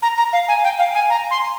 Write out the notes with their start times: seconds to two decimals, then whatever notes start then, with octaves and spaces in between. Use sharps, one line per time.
0.02 A#5
0.18 A#5
0.33 F5
0.48 G#5
0.64 G5
0.79 F5
0.95 G#5
1.10 A#5
1.31 C6